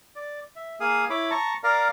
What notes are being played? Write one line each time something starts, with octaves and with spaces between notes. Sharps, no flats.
D5
E5
A#3 G#4 F5 D#6
E4 C#5 B5 D6
A5 A#5 C#6
A#4 D5 F5 A#5